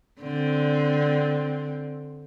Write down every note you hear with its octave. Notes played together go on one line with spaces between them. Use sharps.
D3 C4